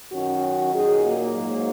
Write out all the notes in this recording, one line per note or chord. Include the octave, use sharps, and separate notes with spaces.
F#2 D#3 F#3 C#4 F#4
A#2 F#3 D#4 G#4
A#3
G#2 F#3